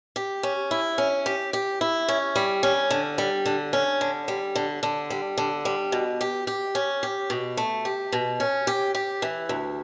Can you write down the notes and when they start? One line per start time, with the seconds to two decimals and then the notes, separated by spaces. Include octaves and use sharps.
0.16 G4
0.43 C#4
0.71 E4
0.98 C#4
1.26 G4
1.53 G4
1.81 E4
2.08 C#4
2.36 G3
2.63 C#4
2.91 D3
3.18 G3
3.46 D3
3.73 C#4
4.01 D3
4.28 G3
4.55 D3
4.83 D3
5.10 G3
5.38 D3
5.65 G3
5.92 B2
6.21 G4
6.47 G4
6.75 C#4
7.03 G4
7.30 B2
7.57 A3
7.85 G4
8.12 B2
8.40 C#4
8.67 G4
8.95 G4
9.22 E3
9.49 D2